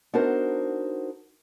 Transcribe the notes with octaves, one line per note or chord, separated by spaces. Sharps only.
B3 D4 D#4 F#4 A#4 C5